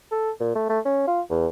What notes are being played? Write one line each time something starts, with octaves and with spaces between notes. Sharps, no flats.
A4
A#2
A3
A3
C#4
F4
E2